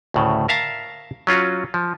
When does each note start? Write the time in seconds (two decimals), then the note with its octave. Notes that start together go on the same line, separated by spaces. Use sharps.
0.14 D2 A2 C#3
0.48 A#4 E5 F5 A5 A#5
1.27 F#3 C#4 F4 F#4
1.74 F3